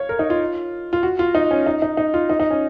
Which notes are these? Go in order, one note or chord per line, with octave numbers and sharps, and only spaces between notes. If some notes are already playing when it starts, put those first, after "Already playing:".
Already playing: C#5 F5
A#4
D#4
F4
F4
F#4
F4
D#4
C#4
D#4
D#4
D#4
F4
D#4
D#4
C#4